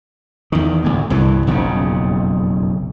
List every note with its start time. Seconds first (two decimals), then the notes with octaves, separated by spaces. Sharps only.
0.52 E2 D#3
0.84 D2 A2
1.10 C2 G2 E3
1.47 F#1 B1 F2 C#3